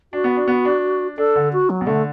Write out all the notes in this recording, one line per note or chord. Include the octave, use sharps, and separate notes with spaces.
D4 F#4
B3
D4
B3
D4
D4 A4
D3
F#4
F#3
B2
D3 A3